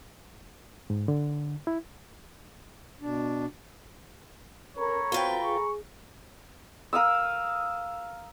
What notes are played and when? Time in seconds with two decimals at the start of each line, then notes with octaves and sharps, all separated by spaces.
0.90 G#2
1.08 D3
1.67 E4
3.02 B2 D4
4.77 C#4 A4 A#4 C#5 A#5 B5
5.12 C4 F4 F#4 B4 G5
5.44 G#4 C#6
6.93 A#4 F5 D#6 E6